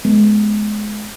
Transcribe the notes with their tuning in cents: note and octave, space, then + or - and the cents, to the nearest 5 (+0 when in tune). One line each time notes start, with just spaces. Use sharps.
G#3 +25 B3 +0